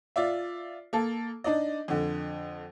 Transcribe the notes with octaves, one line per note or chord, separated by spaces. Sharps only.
F4 D5 E5
A#3 A4
D4 D#4 D5 D#5
F2 D3